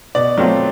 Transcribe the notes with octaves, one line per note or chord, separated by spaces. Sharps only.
B2 D5
F#3 A3 C4 F4